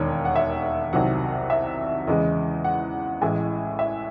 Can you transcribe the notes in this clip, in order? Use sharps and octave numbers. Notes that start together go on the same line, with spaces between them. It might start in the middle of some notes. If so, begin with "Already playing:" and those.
Already playing: E1 D#2 D#3 C#5
F#5
E5
C2 C3 D#3 F#3 F#5
E5
E2 C#3 E3 G#3 D#5
F#5
A1 A2 E3 G#3 G#5
E5